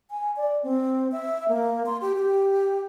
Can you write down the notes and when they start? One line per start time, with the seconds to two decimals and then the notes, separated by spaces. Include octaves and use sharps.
0.11 G#5
0.37 D5
0.63 C4
1.12 E5
1.48 A#3
1.86 C6
2.01 G4
2.15 G4